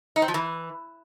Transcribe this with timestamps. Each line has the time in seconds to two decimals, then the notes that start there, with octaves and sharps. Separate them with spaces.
0.16 D#4
0.22 C4
0.28 F3
0.34 E3